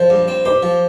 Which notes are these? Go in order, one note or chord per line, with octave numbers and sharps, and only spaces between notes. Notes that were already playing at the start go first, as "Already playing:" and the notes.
Already playing: F3 C5
G2
C4
G4 C5
F3